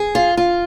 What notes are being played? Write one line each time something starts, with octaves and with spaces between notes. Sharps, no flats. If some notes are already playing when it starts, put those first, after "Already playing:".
Already playing: G#4
F4
F4